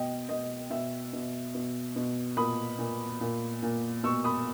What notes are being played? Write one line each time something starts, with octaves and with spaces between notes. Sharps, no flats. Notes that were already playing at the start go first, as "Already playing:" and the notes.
Already playing: B2 D#5 G5
B2 D#5
B2 E5
B2
B2
B2
A#2 B5 D#6
A#2
A#2
A#2
B2 C#6 E6
B5 D#6